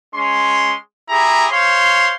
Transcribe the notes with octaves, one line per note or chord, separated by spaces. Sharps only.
G#3 C#4 C6
E4 G4 G#4 A#5
C5 C#5 F5 C6